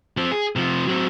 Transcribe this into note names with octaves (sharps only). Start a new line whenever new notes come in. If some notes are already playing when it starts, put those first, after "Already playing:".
F3 C4
G#4
C3 F3
F#3 C4